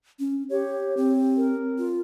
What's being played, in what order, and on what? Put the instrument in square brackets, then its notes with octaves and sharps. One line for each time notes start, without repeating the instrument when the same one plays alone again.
[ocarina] C#4
[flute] G4 [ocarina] C#5
[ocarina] C4
[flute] A#4
[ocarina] F4